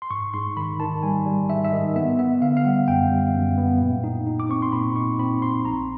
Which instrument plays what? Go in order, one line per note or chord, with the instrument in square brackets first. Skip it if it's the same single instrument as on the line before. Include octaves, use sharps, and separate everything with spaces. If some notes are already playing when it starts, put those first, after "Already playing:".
[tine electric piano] C6
G#2 C#6
G#2 C6
D#3 B5
D#3 A5
G3 G#5
G3
G#2 E5
E5
D#3 D#5
B3 E5
B3 E5
D3 F5
F5
G3 F#5
F#2 G5
G3
F#2
B3
A#2
D#4
D#4
D6
C4 C#6
C6
A#2 B5
D#4 C#6
C4 B5
C4 C6
A#1 A#5